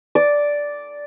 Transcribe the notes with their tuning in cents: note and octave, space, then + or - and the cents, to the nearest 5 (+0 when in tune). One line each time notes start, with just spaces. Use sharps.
D5 -5